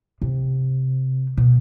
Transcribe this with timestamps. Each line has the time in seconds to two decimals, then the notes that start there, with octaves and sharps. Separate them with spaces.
0.22 C3
1.37 B2